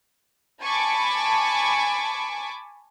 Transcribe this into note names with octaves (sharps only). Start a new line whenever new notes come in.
G#5 A5 B5 C#6 D6